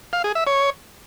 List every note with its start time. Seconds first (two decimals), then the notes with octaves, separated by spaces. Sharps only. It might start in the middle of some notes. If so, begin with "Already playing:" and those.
0.13 F5
0.24 G#4
0.35 E5
0.47 C#5